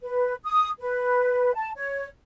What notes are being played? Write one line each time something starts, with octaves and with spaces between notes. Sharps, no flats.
B4
D#6
B4
A5
C#5